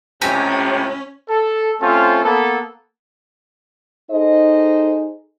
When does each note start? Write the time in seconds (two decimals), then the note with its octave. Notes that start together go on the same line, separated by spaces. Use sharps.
0.22 C#2 A2 C3 C#4 G4 G#5 A#5
1.29 A4
1.81 A3 C4 C#4 F4 A4 C5
2.24 A#3 B3 A4
4.11 D#4 G#4 A4 C5 D#5